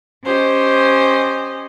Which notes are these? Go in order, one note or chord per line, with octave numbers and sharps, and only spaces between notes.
C#4 G4 C5 D#5